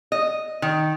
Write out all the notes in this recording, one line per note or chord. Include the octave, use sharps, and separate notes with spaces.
D#5
D#3